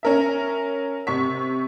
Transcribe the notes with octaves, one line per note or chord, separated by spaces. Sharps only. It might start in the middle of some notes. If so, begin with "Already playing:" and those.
C#4 A#4 E5
C3 C#6 B6